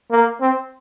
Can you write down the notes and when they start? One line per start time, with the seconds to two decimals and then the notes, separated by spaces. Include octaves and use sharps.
0.11 A#3
0.41 C4